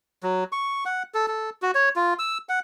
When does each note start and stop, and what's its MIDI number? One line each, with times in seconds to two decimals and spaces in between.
0.23 0.44 54
0.52 0.84 85
0.85 1.03 78
1.14 1.26 69
1.28 1.50 69
1.62 1.71 66
1.75 1.89 73
1.96 2.14 65
2.19 2.38 88
2.49 2.59 78